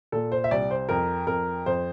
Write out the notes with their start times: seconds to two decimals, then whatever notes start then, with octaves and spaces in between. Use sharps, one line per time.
0.12 A#2 A4
0.32 C5
0.44 E5
0.51 C2 D5
0.71 C5
0.89 F2 A#4
1.27 F2 A#4
1.66 F2 C5